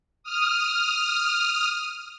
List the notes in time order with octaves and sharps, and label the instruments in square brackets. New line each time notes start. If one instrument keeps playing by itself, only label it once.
[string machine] D#6 F6